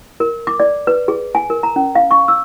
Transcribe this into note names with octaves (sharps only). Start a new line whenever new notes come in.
A#4
D6
D5
B4
G#4
G#5
A#4
A#5
C#4
F5
C#6
E6